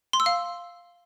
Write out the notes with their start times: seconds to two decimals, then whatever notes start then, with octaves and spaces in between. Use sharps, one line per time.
0.13 C6
0.20 E6
0.26 F5